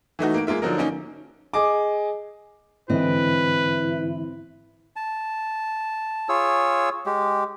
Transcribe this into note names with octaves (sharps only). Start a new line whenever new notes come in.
E3 A3 D#4 F#4
A#3 D7
G#3 A#3 F4 E5
D3 F3 F#3 D#4 A#4
A#3 C#4 D#4
G#4 D#5 D6
G#2 D3 E3 C4 E4 B4 D#5
A5
F4 G#4 C#5 E6
G#3 G4